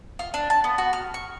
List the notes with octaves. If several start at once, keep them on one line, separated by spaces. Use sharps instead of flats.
F4
D4
A5
B3
F#4
F6
C#6